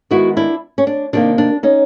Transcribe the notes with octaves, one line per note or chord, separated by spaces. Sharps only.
D#3 G#3 B3 E4 F#4
D4 E4
C#4
D4
C3 D#3 G3 A#3 D4
D4
C#4 D#4